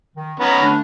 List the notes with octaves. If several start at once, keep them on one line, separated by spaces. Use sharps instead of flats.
D#3
B3 C#4 D#4 A#5
D3 A3 D4